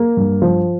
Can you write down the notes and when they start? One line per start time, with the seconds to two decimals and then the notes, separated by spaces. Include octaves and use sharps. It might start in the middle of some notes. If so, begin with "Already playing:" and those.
Already playing: A#3
0.17 G2
0.42 F3